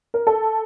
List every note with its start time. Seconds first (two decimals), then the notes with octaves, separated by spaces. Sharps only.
0.14 A#4
0.27 A4